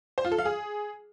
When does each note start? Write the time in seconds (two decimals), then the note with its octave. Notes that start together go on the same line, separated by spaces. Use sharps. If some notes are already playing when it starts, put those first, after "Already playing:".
0.18 C5
0.25 F4
0.32 A4
0.38 F5
0.45 G#4